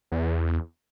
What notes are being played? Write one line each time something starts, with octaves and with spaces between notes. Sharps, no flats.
E2